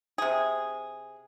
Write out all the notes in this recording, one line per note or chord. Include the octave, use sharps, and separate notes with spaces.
C3 G#4